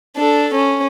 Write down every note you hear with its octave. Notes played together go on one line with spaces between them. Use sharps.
D4 A4
C#4